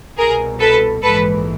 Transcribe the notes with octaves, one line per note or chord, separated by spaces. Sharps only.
C2 B2 G#4 A#4
A4 B4
A#1 G#2 E3 A4 B4